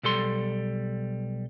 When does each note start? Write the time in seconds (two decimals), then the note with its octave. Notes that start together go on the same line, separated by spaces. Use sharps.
0.03 B1 G3 A4 C6